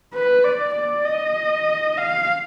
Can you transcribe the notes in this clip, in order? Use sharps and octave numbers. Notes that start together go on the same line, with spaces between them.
B4
D5
D5
D#5
F5